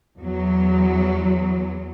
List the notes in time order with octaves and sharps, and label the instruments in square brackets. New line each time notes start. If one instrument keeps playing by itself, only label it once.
[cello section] E2 F#3